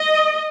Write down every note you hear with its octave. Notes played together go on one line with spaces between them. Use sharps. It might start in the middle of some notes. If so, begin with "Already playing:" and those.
Already playing: D#5